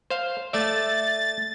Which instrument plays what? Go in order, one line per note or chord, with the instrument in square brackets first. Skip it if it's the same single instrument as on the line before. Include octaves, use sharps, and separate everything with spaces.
[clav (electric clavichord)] C5 F5
[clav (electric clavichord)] A3 D5 E5 [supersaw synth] A6